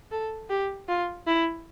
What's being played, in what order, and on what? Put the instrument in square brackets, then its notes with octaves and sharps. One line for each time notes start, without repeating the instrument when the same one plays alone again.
[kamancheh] A4
G4
F4
E4